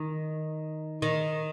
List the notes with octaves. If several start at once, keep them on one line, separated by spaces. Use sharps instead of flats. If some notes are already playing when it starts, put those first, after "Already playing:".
Already playing: D#3
D#3